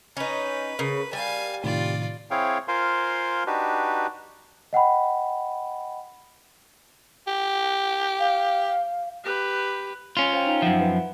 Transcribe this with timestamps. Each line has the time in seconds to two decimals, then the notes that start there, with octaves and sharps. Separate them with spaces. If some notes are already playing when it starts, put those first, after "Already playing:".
0.17 C#4 D#4 B4
0.79 C#3 A#4
1.13 G3 F5 G#5
1.64 A2 C3 D#3 F4 D5
2.31 C4 E4 G#4 C#5 F5 G5
2.68 F4 A#4 C5 F5 G#5 C6
3.47 D4 D#4 F#4 G4 B4
4.73 D#5 F#5 G5 B5
7.27 G4
8.19 F5
9.24 G4 B4
10.17 C#4 F4
10.33 C5 F5 G5
10.47 D#4 F5 G5
10.62 F#2 F3 E5 F#5 D7
10.81 B4